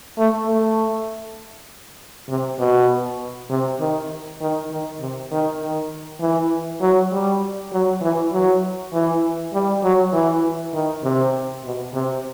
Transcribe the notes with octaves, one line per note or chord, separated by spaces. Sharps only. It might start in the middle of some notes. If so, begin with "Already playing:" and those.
A3
A3
C3
B2
C3
D#3
D#3
D#3
C3
D#3
D#3
E3
F#3
G3
F#3
E3
F#3
E3
G3
F#3
E3
D#3
C3
B2
C3